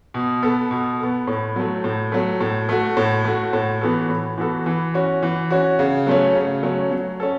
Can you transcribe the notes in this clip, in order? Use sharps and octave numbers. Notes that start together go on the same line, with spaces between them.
B2
B3 A4
B2
B3 A4
A2
F#3 A3
A2
F#3 A3
A2
A3 F#4
A2
A3 F#4
A2
E3 B3 F#4 A4
A2
E3 B3 F#4 A4
E3
C#4 F#4
E3
C#4 F#4
C#3
F#3 A3 C#4
C#3
F#3 A3 C#4
F#3
C#4 A4